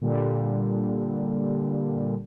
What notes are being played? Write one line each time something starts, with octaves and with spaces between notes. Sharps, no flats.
A#2 D3 G3